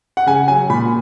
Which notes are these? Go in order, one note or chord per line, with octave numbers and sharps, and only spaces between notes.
F#5
C#3 G#5
F#3 G#5
A#2 B5